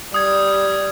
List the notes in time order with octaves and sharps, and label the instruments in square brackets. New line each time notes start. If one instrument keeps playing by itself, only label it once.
[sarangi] G3 [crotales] D#6 G#6